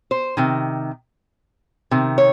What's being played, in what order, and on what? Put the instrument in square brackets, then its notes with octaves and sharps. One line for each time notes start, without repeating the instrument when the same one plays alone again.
[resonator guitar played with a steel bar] C5
C3 D#3
C3 D#3
C#5